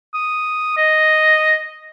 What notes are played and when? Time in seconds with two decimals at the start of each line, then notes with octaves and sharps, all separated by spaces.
0.14 D#6
0.77 D#5